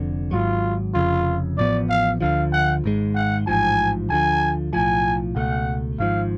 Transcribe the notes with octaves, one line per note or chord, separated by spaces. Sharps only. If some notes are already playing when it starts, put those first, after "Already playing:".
Already playing: F1 F2 D3
G#1 G#2 F#3 F4
F1 F2 C#3 F4
A1 A2 F3 B3 D5
F5
D2 D3 F3 F5
F#5
G#1 G#2 G#3
F#5
A1 G#2 F3 G#5
D2 D3 F3 G#5
B1 A2 F3 G#5
C#2 B2 A3 F#5
G#1 G#2 F3 F5